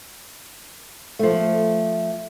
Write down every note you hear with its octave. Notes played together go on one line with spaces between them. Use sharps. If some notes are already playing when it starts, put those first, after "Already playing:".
F3 A3